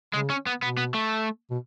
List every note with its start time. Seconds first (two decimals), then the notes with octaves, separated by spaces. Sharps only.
0.13 C#3 G#3
0.30 C#4
0.46 B3
0.62 B2 B3
0.77 B3
0.94 A3
1.50 B2